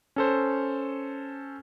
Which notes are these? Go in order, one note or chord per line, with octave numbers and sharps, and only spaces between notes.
C#4 A4 C5